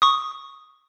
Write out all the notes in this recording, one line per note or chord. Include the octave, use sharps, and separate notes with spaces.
C#6 D#6